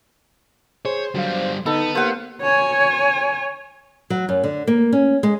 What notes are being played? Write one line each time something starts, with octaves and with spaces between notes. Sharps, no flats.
G#4 C5 C#5
D3 F#3 G3 F5
D3 B3 D#4 A4 B5
A#3 G4 A#4 C5 F5 F#5
C#5 G#5
F#3
F#2
D3
A#3
C#4
G#3